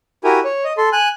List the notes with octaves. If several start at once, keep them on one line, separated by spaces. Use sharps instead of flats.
E4 F#4 G4 A#4 G#5
C#5
D#5
A4 C6
G#5 F#6